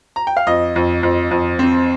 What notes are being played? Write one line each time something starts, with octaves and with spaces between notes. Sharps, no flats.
A#5
G5
F5
F2 D#5
F2
F2
F2
C4